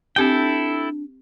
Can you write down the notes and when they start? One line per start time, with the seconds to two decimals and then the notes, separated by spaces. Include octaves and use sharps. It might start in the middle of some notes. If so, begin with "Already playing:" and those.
0.16 C4 D4 E4 G4 A4 G5 G#5